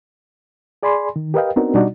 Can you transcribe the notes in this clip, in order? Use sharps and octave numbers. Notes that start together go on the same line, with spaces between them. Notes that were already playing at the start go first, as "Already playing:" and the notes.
G#4 D5 G#5 B5 C6
D#3
G4 A#4 B4 D#5 F5 G5
B3 C4 D4 D#4 F#4 A#4
B2 G3 D4 D#4 F#4 D5